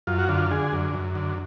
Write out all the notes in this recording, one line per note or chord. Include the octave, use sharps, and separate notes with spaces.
F#2 F4
F#4
D3 F4
D3 G#4
F#2
F#2
D3